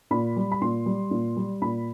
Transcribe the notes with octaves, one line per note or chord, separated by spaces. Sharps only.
A#2 B5
G3
B5
A#2 C6
G3
A#2
G3
A#2 B5